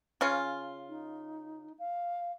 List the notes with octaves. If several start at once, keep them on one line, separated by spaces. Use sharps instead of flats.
C#3 C#4 F4
D#4
F5